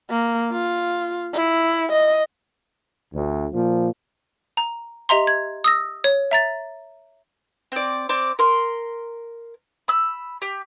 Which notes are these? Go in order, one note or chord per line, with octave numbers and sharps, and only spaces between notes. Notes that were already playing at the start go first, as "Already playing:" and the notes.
A#3
F4
E4
D#5
D2
A#2 F3
A#5
G4 D#5 E5 A#5 C6
G#6
D#6 E6 A#6
C#5
E5 A#5 A6
C4 D5
C4 D5 D6
A#4 C6
B5 E6
G4